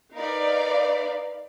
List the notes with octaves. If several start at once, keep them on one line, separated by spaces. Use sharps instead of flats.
D#4 A#4 B4 D5 F5